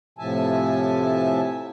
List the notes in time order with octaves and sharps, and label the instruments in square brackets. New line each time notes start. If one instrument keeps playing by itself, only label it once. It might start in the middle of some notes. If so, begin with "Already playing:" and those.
[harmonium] A2 C3 F3 E5 G#5 A5